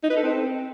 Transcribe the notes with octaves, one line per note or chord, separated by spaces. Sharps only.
D#4
B4
A4
C4